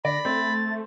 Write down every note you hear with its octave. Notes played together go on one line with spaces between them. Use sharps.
D3 D5 B5 A#6
A3 C4 A6